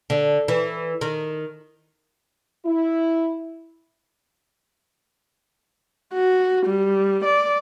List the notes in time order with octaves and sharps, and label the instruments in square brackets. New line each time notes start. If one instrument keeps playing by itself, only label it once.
[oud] D3
E3
D#3
[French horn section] E4
[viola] F#4
G3
D5